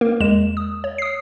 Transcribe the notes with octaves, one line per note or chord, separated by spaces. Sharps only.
A#3 A#4
E2 G#3 E7
D#6
C#5
D#6 C7